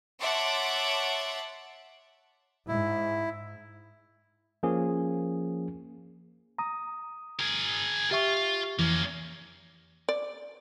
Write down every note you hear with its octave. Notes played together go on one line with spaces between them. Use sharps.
C#5 E5 F#5 A5 C6 D6
G#2 E4
F3 A#3 C#4 G#4
A#5 D#6
G#4 A#4
F4 G4 E5 C#6
F2 E3 A#3 C#4
D5